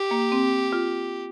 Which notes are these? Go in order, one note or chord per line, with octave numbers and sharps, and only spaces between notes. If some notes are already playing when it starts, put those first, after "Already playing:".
Already playing: G4
A#3
C4
F4